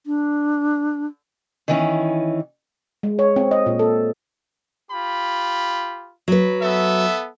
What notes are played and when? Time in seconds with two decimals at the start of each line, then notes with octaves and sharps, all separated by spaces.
0.06 D4
1.68 D#3 E3 C#4
3.03 G#3
3.19 C#5
3.36 C4
3.51 D#5
3.66 A#2
3.79 A4
4.91 F4 G4 B5
6.28 F#3 B4
6.62 B3 A4 E5